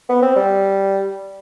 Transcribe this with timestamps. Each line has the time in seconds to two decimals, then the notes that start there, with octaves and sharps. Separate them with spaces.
0.09 B3
0.22 C4
0.36 G3